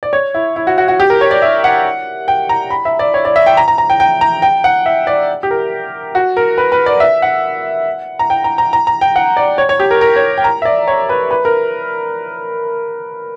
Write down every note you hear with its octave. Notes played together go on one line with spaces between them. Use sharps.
D5
C#5
E4
E4
F#4
F#4
F#4
G4
A#4
C#5
D5
E5
F#5
G5
A#5
B5
E5
D5
C#5
D5
E5
G5
A#5
A#5
A#5
G5
G5
A#5
G5
F#5
E5
D5
G4
A#4
F#4
A#4
B4
B4
D5
E5
F#5
A#5
G5
A#5
A#5
A#5
A#5
G5
F#5
D5
C#5
C#5
G4
A#4
A#4
C#5
G5
A#5
E5
D5
C#5
B4
B4
A#4